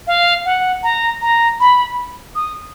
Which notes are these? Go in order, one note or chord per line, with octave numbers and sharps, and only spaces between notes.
F5
F#5
A#5
A#5
B5
D#6